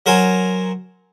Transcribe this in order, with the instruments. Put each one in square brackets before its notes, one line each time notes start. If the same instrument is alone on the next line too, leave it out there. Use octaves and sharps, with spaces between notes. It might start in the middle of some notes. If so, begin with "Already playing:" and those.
[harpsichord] F#3 A#4 C5 G#5